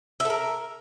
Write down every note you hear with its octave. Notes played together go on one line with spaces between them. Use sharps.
A4 A#4 E5